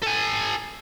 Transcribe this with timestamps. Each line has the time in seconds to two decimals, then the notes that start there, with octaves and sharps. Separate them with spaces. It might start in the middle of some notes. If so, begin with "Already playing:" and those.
0.02 A4 G#5